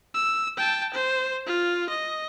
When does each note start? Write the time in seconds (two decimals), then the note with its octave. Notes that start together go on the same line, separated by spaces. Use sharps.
0.14 E6
0.57 G5 A5
0.94 C5
1.47 F4
1.89 D#5